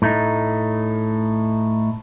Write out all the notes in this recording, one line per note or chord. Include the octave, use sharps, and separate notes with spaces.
A2 A3 D#4